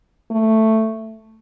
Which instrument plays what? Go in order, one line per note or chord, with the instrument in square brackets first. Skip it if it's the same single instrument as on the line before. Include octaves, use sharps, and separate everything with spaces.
[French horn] A3